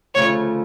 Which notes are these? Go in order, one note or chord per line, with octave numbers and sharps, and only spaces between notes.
D2 C#3 F3 A3 C#5